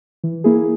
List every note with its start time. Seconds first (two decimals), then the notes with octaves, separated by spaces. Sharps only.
0.24 E3
0.44 A#3 E4 G#4